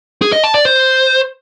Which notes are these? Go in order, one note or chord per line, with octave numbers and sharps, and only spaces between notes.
G#4
D#5
A5
D5
C5